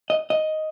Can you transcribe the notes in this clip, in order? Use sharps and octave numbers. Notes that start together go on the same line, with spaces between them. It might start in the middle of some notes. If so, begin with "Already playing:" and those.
D#5
D#5